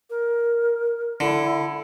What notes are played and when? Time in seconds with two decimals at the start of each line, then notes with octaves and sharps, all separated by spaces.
0.10 A#4
1.20 D3 E4